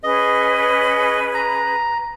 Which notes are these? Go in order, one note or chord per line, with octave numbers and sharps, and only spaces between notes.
C#4 G#4 B4 D#5
A#5